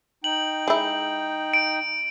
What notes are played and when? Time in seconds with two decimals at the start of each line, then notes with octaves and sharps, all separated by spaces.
0.24 D#4 G5 F#7
0.68 G#3 E4
1.53 D7